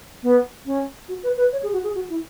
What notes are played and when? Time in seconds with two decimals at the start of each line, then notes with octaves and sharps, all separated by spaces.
0.23 B3
0.66 C#4
1.09 F#4
1.23 B4
1.37 B4
1.52 C#5
1.63 G#4
1.73 F#4
1.84 G#4
1.95 F#4
2.10 E4